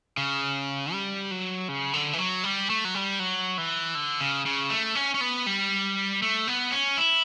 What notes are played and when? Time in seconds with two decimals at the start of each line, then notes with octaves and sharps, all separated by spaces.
0.17 C#3
0.92 G3
1.31 F#3
1.68 C#3
1.93 D3
2.13 E3
2.18 F#3
2.43 G3
2.70 A3
2.85 F#3
2.94 G3
3.19 F#3
3.58 E3
3.95 D3
4.21 C#3
4.46 C#3
4.70 A3
4.95 C#4
5.14 C#4
5.21 B3
5.47 G3
6.22 A3
6.47 B3
6.72 C#4
6.98 E4